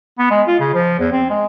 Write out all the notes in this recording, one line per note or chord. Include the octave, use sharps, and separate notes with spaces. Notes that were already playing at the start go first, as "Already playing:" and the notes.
B3
G#3
F4
C#3
F3
E2
C4
G#3